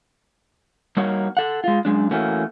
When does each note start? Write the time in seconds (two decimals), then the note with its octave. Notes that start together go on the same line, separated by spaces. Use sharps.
0.97 G3 A#3 D#4 F#4 C#5
1.37 A4 F#5
1.64 G#3 F4
1.85 F#2 C3 G#3 D4
2.11 E3 A3 A#3 C#4 F#4